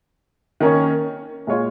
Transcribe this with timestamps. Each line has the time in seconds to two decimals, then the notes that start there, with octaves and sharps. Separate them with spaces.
0.60 D#3 A#3 C#4 A#4 C#5
1.47 A#2 G#3 F4 C#5